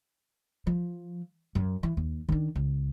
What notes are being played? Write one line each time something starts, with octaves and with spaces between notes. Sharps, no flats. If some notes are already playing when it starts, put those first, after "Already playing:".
F3
F#2
E3
D#2
D#3 D4
C#2